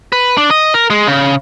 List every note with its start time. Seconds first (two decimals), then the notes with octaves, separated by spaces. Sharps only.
0.12 B4
0.38 D4
0.51 D#5
0.74 A#4
0.90 G#3
1.07 C#3